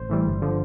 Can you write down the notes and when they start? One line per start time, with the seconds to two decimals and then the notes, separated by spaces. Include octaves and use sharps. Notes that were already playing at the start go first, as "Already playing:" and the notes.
Already playing: A1 C5
0.09 A2 E3 G3
0.26 G1
0.42 D3 F3